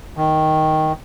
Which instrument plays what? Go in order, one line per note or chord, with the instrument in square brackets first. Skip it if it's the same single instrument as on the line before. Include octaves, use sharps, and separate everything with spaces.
[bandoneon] D#3